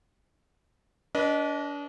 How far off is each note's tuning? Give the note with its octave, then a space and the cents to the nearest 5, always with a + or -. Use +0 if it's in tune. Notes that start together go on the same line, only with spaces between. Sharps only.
D4 -35 B4 -25 D#5 +0